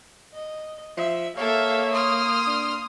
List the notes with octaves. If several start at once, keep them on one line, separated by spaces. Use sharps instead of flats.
D#5
F3 E5
A#3 A4 C#5 E5 F5
C6 D#6 F6
D4